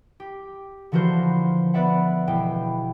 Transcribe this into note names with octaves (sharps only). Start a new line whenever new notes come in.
G4
D3 E3 F3 F#4 A#4 C5
B3 B4 D5 E5 F#5
E1 G5